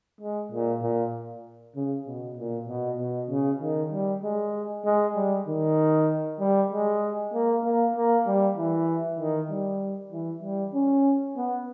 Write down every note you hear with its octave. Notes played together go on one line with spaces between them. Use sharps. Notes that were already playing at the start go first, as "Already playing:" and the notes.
G#3
A#2
A#2
C#3
B2
A#2
B2
B2
C#3
D#3
G3
G#3
G#3
G3
D#3
G3
G#3
A#3
A#3
A#3
G3
E3
D#3
G3
E3
G3
C#4
B3